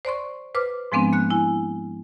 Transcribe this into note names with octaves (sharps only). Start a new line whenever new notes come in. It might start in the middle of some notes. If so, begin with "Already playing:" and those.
C5 D5 C6 C#6
B4 C5 D6 F6
G#2 F3 G#3 B3 C4 D4
A#3 F#6
E4 G#5